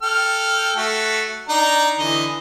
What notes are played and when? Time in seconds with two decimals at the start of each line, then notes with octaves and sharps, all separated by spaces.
0.02 A4 G5 F6
0.76 A3 F#4
1.49 D4 D#4 A#5
1.99 D3 E3 D#5